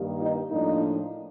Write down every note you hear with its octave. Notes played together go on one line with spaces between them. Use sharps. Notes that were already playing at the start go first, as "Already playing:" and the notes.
Already playing: G2 D#3 G3 A#3
D#4
A2 F3 A#3 D4 D#4